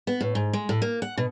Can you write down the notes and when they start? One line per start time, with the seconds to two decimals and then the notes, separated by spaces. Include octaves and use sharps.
0.07 B3
0.21 A2
0.35 G#2
0.53 G#3
0.69 A2
0.82 A#3
1.02 F#5
1.17 B2